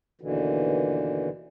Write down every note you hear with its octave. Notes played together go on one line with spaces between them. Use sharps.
D#2 B2 D3 E3